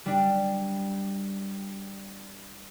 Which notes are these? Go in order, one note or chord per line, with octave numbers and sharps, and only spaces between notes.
G3 D4